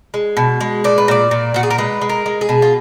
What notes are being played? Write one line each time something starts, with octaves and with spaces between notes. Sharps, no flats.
G#3
B2
G#3
A#2 D5
B4
A#2 D5
A#2
A#2 F#4
G#4
A#4
G#3 B4
G#3
A#4
G#3
G#4
B2
F4